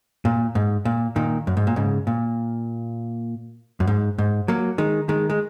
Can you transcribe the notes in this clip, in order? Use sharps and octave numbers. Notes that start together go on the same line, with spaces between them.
A#2
G#2
A#2
A#2 D#3
F#2
G#2
A#2
G#2 C#3
A#2
F#2
G#2
G#2
F#3 A#3
D#3 G#3
D#3 G#3
G#3